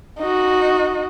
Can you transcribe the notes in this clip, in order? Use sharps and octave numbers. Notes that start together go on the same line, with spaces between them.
D#4 F#4